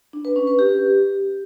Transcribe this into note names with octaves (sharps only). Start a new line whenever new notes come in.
D4
B4
C#4
B4
G4